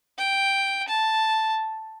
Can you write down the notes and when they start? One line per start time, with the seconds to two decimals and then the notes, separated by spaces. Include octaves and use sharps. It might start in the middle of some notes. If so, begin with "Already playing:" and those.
0.18 G5
0.88 A5